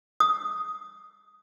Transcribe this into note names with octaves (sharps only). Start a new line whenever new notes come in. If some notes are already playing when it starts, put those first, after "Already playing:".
D#6